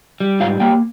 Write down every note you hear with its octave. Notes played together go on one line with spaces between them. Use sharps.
G3
G#2 F4 F5
A#3 G4 G5